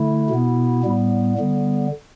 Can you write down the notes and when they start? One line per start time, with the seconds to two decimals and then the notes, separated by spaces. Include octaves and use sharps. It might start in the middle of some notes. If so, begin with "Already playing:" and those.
Already playing: D3 A3 E4
0.30 B2 B3
0.83 A2 G3 B3
1.37 D3 G3 B3